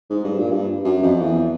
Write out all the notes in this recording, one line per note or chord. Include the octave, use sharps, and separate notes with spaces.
G#2
G2
A#2
G2
F#2
F2
E2